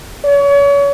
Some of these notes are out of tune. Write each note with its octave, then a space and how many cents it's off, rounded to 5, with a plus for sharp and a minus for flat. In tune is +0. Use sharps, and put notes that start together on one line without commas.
C#5 +35